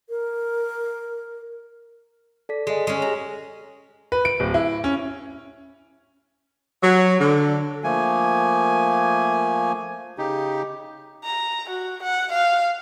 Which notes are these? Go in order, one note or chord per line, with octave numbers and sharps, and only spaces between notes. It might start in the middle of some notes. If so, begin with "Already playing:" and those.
A#4
A4 D5 B6
G#3 G#4 D#5
G#3 C#4
G4 A#5 A#6
B4
D7
D1
E4
C#4
F#3
D3
F3 A3 A#3 G#5
C#3 D#4 G4
A#5
F#4
F#5
F5